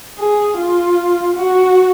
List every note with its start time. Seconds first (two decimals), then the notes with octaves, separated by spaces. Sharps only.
0.19 G#4
0.57 F4
1.36 F#4